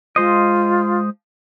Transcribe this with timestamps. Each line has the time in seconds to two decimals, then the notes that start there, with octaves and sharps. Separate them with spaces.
0.16 G#3 F4 C5 D#5